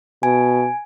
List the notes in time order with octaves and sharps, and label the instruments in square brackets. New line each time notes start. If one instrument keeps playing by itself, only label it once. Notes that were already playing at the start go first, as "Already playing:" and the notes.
[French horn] B2 [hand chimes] G#5